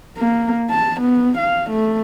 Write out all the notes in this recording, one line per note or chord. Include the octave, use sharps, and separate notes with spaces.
A#3
A5
B3
F5
A3